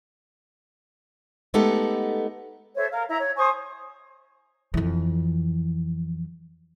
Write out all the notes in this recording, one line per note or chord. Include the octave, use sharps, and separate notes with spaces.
G#3 A3 B3 D#4 G4 A4
A4 C5 C#5 E5
A#4 F5
E4 E5 A#5
C#5
C5 G#5 C#6 D#6
F2 E3